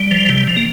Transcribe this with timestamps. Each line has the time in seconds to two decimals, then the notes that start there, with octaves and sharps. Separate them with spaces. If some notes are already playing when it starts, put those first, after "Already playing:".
Already playing: G3
0.11 F3
0.29 C3
0.47 F3
0.56 A#3